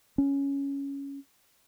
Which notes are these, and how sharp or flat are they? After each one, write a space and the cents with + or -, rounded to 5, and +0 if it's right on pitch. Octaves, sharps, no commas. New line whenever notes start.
C#4 +5